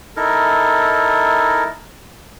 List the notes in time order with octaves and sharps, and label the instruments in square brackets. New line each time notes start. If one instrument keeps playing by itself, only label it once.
[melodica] D#4 E4 A4 A#4